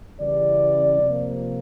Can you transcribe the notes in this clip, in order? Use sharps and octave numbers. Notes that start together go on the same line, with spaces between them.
C#3 E3 G3 D5
C3 F3 A#3